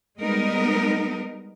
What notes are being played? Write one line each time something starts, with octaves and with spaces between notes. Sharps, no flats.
G3 G#3 B3 D#4 A#4 D#5